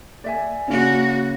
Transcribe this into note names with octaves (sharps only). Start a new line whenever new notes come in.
D5 E5 G#5
C#3 A#3 C#4 F#4